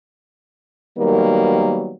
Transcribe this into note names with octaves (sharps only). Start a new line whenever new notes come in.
D#3 F#3 G3 A#3 B3